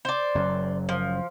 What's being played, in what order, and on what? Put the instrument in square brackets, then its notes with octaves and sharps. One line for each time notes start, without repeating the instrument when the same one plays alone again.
[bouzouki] C5 D5
[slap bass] F#1 F#2
[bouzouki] F3